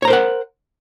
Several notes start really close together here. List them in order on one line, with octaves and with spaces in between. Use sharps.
C#5 A#5 C5 A#4 F#5